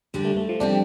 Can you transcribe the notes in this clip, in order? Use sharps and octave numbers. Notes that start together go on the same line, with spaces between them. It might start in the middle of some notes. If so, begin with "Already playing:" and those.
D2 D3 G3 D4
A3
A3
F3
C3 G3 C4 D4